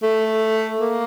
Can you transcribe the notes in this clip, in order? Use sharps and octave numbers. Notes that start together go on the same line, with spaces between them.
A3
A#3